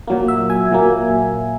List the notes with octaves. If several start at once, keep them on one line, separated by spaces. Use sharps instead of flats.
A#2 F#3 A#3
E5
G#5
A#2 F#3 A#3